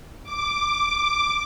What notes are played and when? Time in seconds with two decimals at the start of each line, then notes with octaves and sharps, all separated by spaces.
0.23 D6